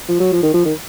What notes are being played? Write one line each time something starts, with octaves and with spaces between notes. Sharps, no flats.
F3
F#3
F3
D#3
F3
D#3